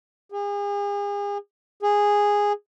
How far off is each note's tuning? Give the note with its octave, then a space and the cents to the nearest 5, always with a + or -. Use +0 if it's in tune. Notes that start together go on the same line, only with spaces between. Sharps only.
G#4 -40
G#4 -10